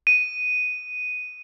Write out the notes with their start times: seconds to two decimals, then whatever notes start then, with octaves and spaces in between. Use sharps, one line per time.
0.07 D#7